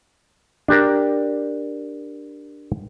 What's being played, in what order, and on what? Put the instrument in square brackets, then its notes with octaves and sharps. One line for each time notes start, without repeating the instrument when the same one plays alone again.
[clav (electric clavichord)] D4 G4 A#4